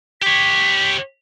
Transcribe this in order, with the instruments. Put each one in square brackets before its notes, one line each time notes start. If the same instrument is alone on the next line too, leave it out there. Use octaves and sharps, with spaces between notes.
[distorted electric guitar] G4 C#5 [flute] B6